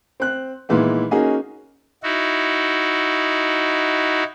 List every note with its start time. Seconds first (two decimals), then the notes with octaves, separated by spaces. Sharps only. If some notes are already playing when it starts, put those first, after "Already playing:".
0.20 C4 F#6
0.69 A#2 D#3 E3 G#3 B3
1.11 A#3 C#4 D#4 F#4 G#4
2.03 D#4 E4 F#4